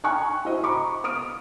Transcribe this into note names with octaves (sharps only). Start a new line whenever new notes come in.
G5 G#5 A#5 C#6 F6 F#6
E4 F#4 C5 D#5
A#5 B5 C#6 D6
D#6 F6 D7